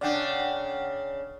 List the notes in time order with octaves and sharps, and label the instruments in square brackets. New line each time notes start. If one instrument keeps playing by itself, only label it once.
[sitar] C#3 D4 [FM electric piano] D5 F#5 G5